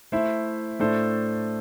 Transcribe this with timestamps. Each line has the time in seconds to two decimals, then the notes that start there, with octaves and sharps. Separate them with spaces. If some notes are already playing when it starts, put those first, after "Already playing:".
0.12 A3 E4 C5 E5
0.80 A2 A3 D4 A4 C5